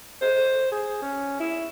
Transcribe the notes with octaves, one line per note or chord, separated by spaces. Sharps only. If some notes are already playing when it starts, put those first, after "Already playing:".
C5
G#4
C#4
E4